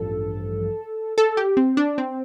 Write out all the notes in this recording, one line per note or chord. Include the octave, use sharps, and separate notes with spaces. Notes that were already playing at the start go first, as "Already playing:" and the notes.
Already playing: A1 G2 F3 A4
A4
G4
C4
D4
C4